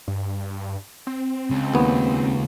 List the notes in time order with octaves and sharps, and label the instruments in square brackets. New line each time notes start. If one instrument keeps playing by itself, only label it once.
[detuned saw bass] G2
C4
[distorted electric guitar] C#2
[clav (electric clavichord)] D#2 B3